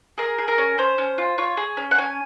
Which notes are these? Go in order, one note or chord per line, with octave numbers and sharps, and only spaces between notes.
G#4 A#4
G#4
A#4
C#4
C#4 C5
C#4
F4
F4 C#5
G#4
C#4
F#5
C#4 G#5